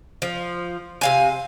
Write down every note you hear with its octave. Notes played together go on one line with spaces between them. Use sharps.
F3
C3 F5 G#5